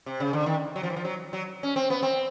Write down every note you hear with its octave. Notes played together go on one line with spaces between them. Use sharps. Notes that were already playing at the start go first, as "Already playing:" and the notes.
C3
C#3
D3
D#3
F#3
F3
E3
F3
F#3
F#3
C#4
C4
B3
C4